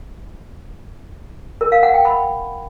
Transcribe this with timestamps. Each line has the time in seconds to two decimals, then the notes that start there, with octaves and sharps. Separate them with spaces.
1.61 A#4
1.72 F5
1.83 F#5
1.94 G5
2.05 B5